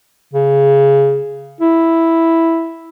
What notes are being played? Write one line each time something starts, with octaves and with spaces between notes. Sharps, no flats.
C#3
E4